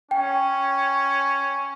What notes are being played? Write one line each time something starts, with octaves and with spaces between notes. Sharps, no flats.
C#4 G5